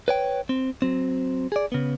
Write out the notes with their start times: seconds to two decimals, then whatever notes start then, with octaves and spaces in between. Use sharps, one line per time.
0.08 B4 C#5 G5
0.49 C4
0.82 F#3 C4
1.52 G#4 D5
1.72 C#3 B3